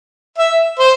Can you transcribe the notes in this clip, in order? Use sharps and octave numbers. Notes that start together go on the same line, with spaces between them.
E5
C5